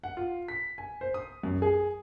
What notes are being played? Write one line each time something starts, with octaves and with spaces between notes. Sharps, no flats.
F#5
F4
B6
G#5
C5
D#6
F#2
G#4